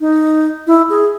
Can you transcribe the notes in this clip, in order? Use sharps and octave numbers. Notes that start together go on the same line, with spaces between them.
D#4
E4
G#4